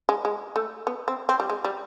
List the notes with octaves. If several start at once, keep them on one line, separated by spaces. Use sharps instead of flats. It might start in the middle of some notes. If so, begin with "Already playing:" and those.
G#3
G#3
A3
B3
C4
C4
G3
G#3
G3